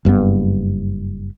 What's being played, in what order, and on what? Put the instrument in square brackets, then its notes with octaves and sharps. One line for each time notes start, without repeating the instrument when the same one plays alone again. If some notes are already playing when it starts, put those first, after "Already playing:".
[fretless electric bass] F#1 G2 B2 B3